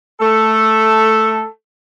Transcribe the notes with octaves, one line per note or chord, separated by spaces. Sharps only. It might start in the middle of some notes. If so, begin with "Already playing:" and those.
A3 A4